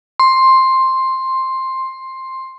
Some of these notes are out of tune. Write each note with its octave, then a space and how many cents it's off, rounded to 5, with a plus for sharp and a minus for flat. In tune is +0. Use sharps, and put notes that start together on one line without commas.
C6 +10